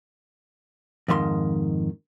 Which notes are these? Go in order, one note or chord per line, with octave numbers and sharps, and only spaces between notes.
F2 G#2 D#3 C6